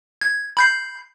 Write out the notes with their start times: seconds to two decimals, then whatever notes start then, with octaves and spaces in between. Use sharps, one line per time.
0.21 G#6
0.57 B5 G6 C7